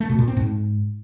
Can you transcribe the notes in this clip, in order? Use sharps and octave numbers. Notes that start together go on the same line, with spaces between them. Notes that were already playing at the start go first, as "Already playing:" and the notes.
A3
B2
A#2
C4
G#2